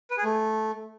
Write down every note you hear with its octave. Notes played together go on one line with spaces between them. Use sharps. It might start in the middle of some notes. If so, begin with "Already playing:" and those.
B4
G#4
A3